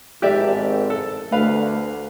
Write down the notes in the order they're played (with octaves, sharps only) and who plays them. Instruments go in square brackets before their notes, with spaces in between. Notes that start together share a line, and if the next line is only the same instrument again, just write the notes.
[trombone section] G#1 [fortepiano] G4 D5 E5
[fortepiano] A4
[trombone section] D2 [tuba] A3 [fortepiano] B4 F5